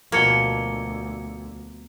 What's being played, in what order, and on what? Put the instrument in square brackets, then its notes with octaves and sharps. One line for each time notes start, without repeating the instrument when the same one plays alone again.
[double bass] D2 [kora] B2 F3 [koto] A#3 [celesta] G#6 C#7 G7